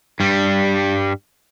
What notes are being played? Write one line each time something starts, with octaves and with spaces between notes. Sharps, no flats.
G2 G3